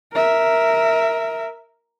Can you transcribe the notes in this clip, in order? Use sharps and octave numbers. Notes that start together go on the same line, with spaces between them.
A#4 E5